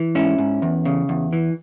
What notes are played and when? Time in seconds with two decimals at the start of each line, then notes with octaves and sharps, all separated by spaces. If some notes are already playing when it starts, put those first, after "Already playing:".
Already playing: E3
0.15 G#2 C#4 E4
0.38 G#2
0.62 E2
0.85 C#3
1.09 E2
1.33 E3